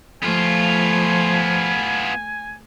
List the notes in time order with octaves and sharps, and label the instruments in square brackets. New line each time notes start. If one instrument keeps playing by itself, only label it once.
[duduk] F3 [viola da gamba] A3 [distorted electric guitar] B3 F4 [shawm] G#5